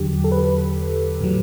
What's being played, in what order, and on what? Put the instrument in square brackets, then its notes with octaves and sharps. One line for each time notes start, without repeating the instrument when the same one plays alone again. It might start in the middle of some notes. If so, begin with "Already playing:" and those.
Already playing: [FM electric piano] E2 D3 F#3 G4
A4
B4
A2 F#3